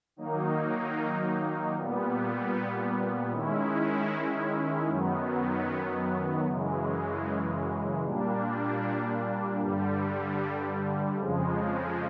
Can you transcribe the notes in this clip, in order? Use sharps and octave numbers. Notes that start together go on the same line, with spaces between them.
D#3 F#3 A#3 D#4
A#2 G3 B3
D#3 G#3 C#4 E4
F#2 D#3 F#3 B3
F#2 C#3 E3 G#3
A#2 G3 A#3 D4
G2 D3 G3
F2 C#3 F3 G#3